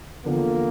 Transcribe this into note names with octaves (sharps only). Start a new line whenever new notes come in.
E2 D3 F3 A#3